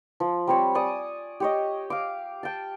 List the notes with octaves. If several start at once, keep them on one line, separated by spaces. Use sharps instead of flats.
F3
G3 C4 C#5
D5 G#5 C#6 D#6
G4 C#5 D#5
F5 D6
G5 A5